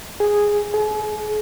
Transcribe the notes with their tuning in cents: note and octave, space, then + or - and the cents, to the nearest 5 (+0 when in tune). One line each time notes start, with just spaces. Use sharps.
G#4 -5
G#4 +40